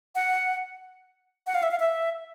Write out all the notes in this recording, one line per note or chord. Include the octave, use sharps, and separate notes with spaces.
F#5
F#5
F5
E5
F5
E5